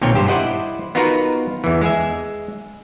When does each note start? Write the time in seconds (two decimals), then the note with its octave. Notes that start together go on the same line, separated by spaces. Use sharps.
0.01 B1 A#2 D#3 C4 C#5 G5
0.14 G2 G4 C5
0.28 E4 C5 D5 D#5 F#5
0.95 B3 D#4 F4 F#4 A#4 B4
1.64 E2 E3
1.81 G#3 G#4 E5